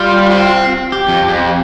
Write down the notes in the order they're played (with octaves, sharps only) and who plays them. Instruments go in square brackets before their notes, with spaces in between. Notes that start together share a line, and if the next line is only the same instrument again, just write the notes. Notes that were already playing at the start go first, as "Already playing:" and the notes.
Already playing: [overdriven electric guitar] G3 [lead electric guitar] F4
[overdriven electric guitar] C4
[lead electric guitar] G4
[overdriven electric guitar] F2
F2